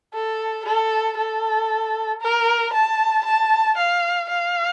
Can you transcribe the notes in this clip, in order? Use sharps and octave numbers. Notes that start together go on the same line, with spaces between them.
A4
A4
A4
A#4
A5
A5
F5
F5